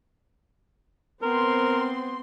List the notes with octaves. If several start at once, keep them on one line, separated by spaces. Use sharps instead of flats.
B3 C4 A#4 C6